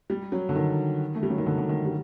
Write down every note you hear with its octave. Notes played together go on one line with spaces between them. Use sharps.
G3
F#3
D3
D#3
A3
G3
F#3
D#3
D3
D3
D#3
G3